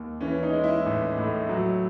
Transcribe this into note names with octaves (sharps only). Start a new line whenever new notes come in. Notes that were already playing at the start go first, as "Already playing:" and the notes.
Already playing: D#2
E3 C#4
D#4
G#3
E4
A1
A2
F#3